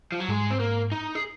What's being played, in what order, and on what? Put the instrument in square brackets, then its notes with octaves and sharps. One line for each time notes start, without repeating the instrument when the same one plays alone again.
[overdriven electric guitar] F3
F#3
[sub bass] G#2 [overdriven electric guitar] G#3
[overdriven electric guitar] C4
A#3
D#4
G#4